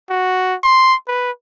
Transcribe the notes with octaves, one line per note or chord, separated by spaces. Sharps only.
F#4
C6
B4